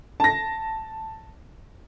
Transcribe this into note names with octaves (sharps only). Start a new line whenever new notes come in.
A5 A#6